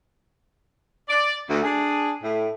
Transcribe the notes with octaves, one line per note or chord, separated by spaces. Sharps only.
D5
D2
D4 G#4
A2